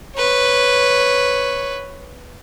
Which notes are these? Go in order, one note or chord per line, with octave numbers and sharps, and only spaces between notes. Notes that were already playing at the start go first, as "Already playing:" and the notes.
B4 C#5